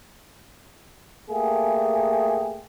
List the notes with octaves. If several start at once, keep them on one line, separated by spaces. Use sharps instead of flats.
A3 A#3 G4 G#4